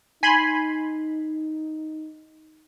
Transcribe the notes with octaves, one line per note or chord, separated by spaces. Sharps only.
D#4 G#5 B5 C6